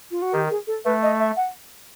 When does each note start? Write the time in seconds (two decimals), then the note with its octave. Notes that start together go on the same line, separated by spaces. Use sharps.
0.11 F4
0.22 F#4
0.33 D#3 G4
0.50 G#4
0.67 A4
0.85 A3 B4
1.03 D#5
1.19 E5
1.37 F#5